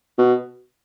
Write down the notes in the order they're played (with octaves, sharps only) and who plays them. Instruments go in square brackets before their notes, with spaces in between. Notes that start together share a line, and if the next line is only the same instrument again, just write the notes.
[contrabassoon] B2